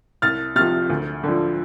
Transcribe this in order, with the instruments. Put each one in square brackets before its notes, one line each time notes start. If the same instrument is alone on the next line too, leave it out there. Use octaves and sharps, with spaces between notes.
[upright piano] C2 F6 A6
C3 F3 F6 A6
D2
D3 F3